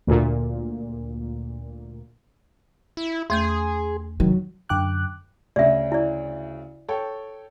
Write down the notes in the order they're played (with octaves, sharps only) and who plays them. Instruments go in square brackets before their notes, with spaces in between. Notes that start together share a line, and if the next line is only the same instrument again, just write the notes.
[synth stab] D2 A#2
[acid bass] E4
[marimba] E2 A3 G6 [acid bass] G#4 [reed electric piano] C6
[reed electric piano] C3 D#3 [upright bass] F#3
[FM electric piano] F#2 D3 G5 D6 F#6
[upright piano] D2 C#3 [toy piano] D5 E5
[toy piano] E4 D5
[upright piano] A4 C#5 G5